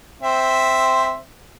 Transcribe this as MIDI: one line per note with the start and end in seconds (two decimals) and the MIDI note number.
0.22 1.17 60
0.22 1.17 72
0.22 1.17 76